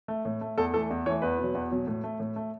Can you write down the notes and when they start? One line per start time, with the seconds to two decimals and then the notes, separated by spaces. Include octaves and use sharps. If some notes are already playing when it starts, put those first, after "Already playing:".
0.08 A3
0.25 A2
0.41 A3
0.58 E2 A4
0.74 E3 A3 A4
0.91 E2
1.06 E3 C#5
1.10 A3
1.22 E2 B4
1.39 B2 F#3
1.55 E2
1.71 B2 F#3
1.87 A2
2.04 A3
2.20 A2
2.36 A3